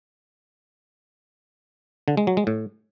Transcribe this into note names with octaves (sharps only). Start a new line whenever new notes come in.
D3
G#3
F#3
G#3
A2